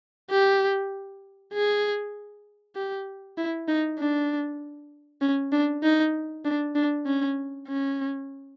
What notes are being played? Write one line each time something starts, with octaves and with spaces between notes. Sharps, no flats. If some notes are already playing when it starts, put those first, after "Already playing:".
G4
G#4
G4
E4
D#4
D4
C#4
D4
D#4
D4
D4
C#4
C#4